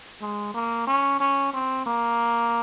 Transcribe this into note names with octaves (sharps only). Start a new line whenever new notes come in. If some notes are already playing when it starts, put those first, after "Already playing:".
G#3
A#3
C#4
C#4
C4
A#3